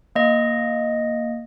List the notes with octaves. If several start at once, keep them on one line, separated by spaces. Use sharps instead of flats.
A#3 D#5